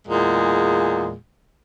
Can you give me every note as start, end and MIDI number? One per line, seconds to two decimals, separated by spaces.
0.08 1.15 40
0.08 1.15 46
0.08 1.15 56